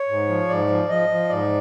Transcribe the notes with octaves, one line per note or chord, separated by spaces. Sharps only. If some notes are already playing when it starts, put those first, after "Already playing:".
Already playing: C#5
G#2
F3
G#2 D5
F3
F3 D#5
F3
G#2 D5